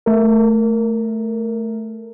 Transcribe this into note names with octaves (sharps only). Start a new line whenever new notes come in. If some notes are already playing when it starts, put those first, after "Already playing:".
A3 A#4